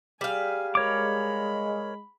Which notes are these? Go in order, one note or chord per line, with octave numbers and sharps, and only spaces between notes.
G3 G#4 F5 G#5
G#3 A#4 C#5 B5 D6